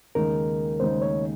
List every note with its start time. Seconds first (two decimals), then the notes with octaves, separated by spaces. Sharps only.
0.15 D#2 C#3 G#3 D#4 A#4
0.80 D#2 C#3 G#3 D#4 C5
1.02 C#5